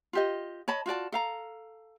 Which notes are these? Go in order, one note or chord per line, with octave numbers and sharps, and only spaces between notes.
F4 G4 D#5
C#5 D#5 A5 B5
F4 F#4 D5 A5
A4 F5 A#5